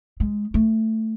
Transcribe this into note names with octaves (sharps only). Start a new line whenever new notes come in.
G#3
A3